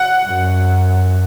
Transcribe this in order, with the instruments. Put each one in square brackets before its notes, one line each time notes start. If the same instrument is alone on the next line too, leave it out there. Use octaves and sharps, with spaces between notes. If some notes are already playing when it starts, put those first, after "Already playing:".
Already playing: [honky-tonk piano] F#5
[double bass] F#2